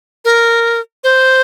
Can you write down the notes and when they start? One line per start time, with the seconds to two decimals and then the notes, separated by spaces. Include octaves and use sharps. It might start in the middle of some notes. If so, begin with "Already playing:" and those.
0.25 A#4
1.04 C5